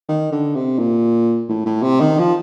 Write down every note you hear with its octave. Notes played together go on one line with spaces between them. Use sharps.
D#3
D3
C3
A#2
A2
A2
C3
D#3
F3